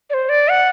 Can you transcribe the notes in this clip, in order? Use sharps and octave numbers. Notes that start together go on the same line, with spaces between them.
D5
C5
D5
F#5